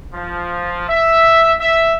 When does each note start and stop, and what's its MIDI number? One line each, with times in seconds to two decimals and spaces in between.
0.13 0.86 53
0.88 1.53 76
1.59 1.96 76